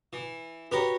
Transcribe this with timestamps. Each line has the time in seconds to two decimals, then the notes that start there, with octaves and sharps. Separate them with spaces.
0.13 E3
0.71 F#4 G4 A#4 B4 C#5